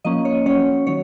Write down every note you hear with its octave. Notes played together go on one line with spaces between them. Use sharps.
F3 A#3 C#4 D#5
C#5
F#3 C#4 C#5
D#3 F#3 C#5